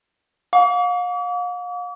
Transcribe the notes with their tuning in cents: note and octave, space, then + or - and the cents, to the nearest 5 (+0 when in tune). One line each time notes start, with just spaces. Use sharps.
F5 +40 D6 -45